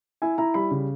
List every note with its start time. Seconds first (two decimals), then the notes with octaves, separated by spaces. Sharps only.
0.22 E4 G#5
0.38 E4 A#5
0.54 G3 B5
0.71 C#3